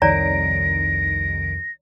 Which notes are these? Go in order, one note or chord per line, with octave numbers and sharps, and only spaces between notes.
C2 F2 D#3 C#5 D5 A#5 A#6 D7